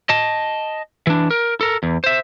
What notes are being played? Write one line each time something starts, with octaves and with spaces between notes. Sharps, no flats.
D#5 A5
E3 D4
A#4
A4 A#4
E2
C5 E5